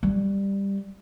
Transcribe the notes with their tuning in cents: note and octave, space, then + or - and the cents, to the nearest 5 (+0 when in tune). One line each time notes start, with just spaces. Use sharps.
G3 +10